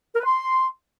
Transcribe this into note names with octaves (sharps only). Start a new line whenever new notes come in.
A#4
B4
C6